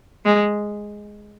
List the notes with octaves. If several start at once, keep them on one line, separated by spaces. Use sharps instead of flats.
G#3